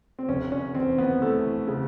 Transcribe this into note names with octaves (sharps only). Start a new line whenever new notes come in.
C4
F1 C#4
C#4
E2 C4
B3
E3 A3
C#3